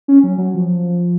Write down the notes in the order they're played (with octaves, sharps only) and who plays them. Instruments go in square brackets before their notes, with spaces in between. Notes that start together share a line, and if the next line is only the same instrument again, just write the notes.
[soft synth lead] C#4
F#3
F#3
F3